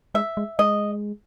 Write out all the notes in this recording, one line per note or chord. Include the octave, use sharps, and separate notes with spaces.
G#3 E5
G#3
G#3 D#5